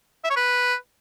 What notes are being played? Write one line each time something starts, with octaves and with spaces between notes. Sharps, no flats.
E5
C#5
B4